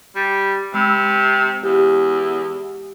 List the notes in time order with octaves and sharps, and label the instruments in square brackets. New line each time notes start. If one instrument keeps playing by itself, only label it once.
[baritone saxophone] G3
[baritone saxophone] C3 [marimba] G#3 B5 E6
[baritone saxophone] E2 [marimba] G4